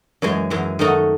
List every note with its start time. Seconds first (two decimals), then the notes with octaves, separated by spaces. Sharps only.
0.22 F#2 E3 G#3
0.50 F#2 E3 G#3
0.79 D#3 A3 D#4 F#4